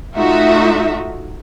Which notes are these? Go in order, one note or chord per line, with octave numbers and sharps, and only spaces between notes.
A3 D#4 F4 F#4 E5